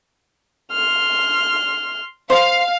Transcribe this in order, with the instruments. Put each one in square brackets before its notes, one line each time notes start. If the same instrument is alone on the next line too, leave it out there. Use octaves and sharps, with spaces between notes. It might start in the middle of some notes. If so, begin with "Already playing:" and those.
[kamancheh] C6 F6
[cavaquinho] C5 C6 [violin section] F5